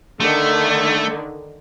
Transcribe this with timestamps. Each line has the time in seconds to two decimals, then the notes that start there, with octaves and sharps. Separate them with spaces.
0.20 D3 D#3 A3